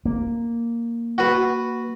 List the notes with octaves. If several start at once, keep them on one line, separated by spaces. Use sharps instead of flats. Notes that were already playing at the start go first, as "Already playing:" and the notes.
A#3
F#4 B4